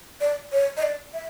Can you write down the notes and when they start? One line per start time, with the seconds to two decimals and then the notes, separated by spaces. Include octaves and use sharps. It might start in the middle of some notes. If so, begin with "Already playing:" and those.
0.20 D5
0.52 C#5
0.77 D#5
0.82 D5
1.14 E5